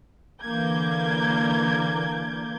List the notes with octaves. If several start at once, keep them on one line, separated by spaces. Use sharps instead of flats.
D3 E3 A#3 D6 G6 G#6